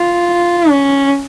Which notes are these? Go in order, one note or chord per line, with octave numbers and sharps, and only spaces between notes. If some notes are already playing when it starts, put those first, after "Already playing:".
Already playing: F4
C#4